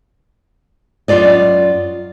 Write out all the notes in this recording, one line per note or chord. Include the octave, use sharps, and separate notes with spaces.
F#2 E3 F4 D5 D#5